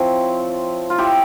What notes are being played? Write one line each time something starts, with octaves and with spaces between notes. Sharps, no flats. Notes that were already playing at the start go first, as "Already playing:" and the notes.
Already playing: F3 C4 E4 C#5
F4
E4 G4